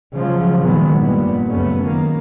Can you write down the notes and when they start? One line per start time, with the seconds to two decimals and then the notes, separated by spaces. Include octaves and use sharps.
0.16 C#3 F3 F#3 G#3
0.60 A#2 D#3 F#3 G#3 B3
0.97 F1 G2 A#2 G3 B3
1.51 C#2 F#2 A3 B3 C#4
1.85 D#3 A#3